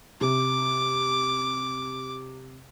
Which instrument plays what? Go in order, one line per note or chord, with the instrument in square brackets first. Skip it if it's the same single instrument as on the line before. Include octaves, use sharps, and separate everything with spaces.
[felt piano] C3 [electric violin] D6